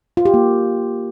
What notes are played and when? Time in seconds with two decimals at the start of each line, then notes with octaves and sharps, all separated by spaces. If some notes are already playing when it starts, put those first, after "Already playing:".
0.17 F4
0.25 G4
0.34 A#3